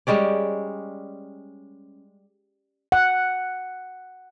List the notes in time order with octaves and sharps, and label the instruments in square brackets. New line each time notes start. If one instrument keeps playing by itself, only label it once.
[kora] G3 G#3 C#4 D5
[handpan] F#5